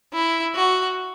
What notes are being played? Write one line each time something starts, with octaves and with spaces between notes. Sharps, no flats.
E4
F#4